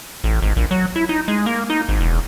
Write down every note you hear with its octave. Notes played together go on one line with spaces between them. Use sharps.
A1
G#1
A#1
F#3
E4
D#4
G#3
A#3
D#4
G#1
E1